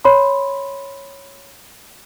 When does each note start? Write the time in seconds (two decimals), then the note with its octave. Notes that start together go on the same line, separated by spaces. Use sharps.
0.05 C#5 B5 C6